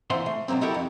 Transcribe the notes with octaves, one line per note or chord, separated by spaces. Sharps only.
A#2 E3 C5 E5 F#5 C6
A3
B2 F#3 G#3 A#3 C4
D#4 E4 F#4 G4 A4 A#4
F2